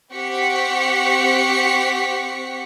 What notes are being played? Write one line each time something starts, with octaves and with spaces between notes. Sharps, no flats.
C4 G4 F#5 C#6 B6 C#7